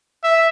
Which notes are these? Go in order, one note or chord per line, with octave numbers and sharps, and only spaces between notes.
E5